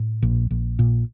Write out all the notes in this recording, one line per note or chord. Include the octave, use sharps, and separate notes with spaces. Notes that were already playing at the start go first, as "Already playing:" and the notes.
Already playing: A2
A#1
A#1
A#2